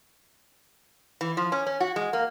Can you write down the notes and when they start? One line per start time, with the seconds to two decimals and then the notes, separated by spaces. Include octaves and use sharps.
1.21 E3
1.37 F3
1.52 C#4
1.67 C#4
1.80 F#4
1.96 G#3
2.13 A#3